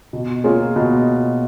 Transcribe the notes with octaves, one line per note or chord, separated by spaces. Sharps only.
B2
A#3 F4 G#4 C#5
B2